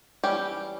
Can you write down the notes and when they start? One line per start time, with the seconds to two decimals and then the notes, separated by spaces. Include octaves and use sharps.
0.24 E3 G3 C#4 G4